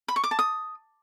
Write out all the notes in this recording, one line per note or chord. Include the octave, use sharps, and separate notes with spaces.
B5
C#6
D6
A5
D#6